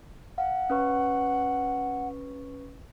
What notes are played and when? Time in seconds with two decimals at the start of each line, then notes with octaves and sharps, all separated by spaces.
0.38 F5 F#5
0.70 C#4 B4 C#6